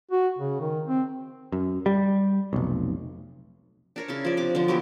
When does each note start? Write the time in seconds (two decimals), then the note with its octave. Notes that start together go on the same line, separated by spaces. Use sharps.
0.11 F#4
0.39 C#3
0.61 D#3
0.87 C4
1.52 F#2
1.86 G3
2.53 F1 B1
3.96 D4 A#4 C#5
4.08 C#3 E4 A5
4.25 F3 D5
4.37 C3 D4 D6
4.55 D3 F3
4.68 F#3 B3 E4 G4